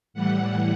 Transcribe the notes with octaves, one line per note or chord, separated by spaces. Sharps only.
A2 E3 G3 F#5